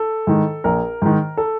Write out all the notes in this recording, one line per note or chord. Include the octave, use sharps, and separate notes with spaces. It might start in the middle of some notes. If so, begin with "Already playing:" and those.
Already playing: A4
G#2 D#3
A#1 A#4
G#2 D#3
A4